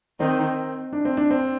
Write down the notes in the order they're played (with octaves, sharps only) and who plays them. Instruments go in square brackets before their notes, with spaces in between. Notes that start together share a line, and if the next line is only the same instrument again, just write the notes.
[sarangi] D#3 [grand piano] C4
[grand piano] D4
C4
D4
C4